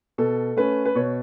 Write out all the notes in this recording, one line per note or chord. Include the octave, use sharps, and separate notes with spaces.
B2 A4
A3 C#4 B4
B4
B2 C#5